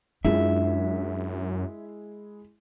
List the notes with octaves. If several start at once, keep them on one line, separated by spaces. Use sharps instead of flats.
F#2 G#3 D4 E4 F4 G#4 E5